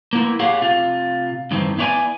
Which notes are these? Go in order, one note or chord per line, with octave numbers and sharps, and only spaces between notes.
A#3 B3 E4
G4 G#4 C#5 F5 F#5
C3 F4
G2 D#3 E3 C4
B3 E4 G4 C#5 D5 G#5